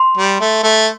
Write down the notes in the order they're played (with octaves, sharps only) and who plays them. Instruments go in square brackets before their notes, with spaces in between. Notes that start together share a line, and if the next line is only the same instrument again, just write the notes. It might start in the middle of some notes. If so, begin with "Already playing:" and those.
Already playing: [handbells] C6
[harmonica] G3
A3
A3